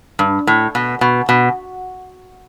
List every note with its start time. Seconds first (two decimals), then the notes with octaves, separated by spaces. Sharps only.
0.19 G2
0.47 A2
0.75 B2
1.01 B2
1.29 B2